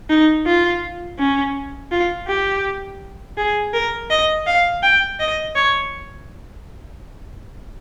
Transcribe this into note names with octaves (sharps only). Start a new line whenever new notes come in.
D#4
F4
C#4
F4
G4
G#4
A#4
D#5
F5
G5
D#5
C#5